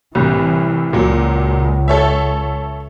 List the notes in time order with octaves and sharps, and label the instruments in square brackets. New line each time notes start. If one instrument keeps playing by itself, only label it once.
[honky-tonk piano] C2 A2 [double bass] E3
[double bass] C#2 [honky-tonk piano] A#2 F#3
[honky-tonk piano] A4 C#5 E5